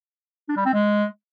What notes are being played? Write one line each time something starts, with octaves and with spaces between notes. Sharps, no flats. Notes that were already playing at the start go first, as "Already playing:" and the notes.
D4
G3
C4
G#3